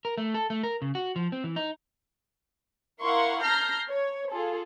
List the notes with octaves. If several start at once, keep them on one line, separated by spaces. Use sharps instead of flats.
A#4
A3
A4
A3
A#4
C#3
F#4
F3
C4
E3
D#4
E4 A#4 F5 F#5 C6 C#6
A5 A#5 F6 G6 A#6 C7
C#5
F4 G#4 A4